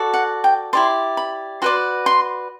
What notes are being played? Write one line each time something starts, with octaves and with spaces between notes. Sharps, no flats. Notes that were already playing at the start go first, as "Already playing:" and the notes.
Already playing: F#4 A4 D5
F#5
G5
E4 G4 D5 C6
B5
F#4 B4 D5 C6
C6